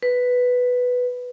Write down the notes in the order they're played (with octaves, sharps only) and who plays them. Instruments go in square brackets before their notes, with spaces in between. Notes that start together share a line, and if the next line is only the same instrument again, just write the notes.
[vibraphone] B4